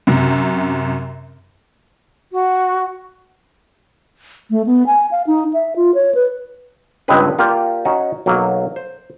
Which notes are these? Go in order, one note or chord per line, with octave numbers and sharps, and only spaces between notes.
F#2 C3
F#4
A3
B3
G#5
F5
D#4
E5
F4
C#5
B4
C#2 G2 G#3 C4 G#4 B4
A#3 F4 G4 D5
C#4 D#4 F#4
B1 F#3 A#3
C5